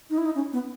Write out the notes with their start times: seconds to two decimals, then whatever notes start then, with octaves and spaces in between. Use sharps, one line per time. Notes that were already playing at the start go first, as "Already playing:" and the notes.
0.10 D#4
0.18 E4
0.25 D#4
0.35 C#4
0.53 B3